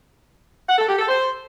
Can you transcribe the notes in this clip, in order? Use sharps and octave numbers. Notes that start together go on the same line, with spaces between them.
F#5
A4
G4
A4
C5